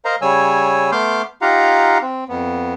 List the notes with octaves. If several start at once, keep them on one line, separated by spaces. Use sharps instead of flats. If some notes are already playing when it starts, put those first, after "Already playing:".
A#4 C5 D#5 F5 A#5
C#3 G3 C#5 G#5 E6
A3 B3 C6 D6 F6 G6
D#4 F4 G4 F5 F#5 A#5
C4
F2 B3